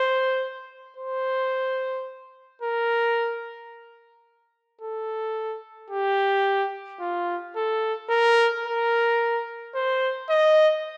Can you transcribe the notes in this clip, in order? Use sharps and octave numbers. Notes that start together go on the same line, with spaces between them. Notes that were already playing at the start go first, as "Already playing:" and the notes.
Already playing: C5
C5
A#4
A4
G4
F4
A4
A#4
A#4
C5
D#5